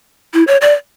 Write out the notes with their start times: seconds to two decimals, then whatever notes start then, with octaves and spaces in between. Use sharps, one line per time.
0.34 E4
0.47 C#5
0.61 D5